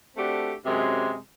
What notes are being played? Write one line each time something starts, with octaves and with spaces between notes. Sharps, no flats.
A3 C4 D4 F#4 G4 A4
F#2 C3 G#3